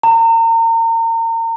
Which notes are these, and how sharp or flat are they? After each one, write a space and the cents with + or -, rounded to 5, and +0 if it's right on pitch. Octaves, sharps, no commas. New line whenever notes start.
A#5 -35